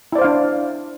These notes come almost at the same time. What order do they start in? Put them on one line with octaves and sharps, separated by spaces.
E4 D5 C5 F5 D4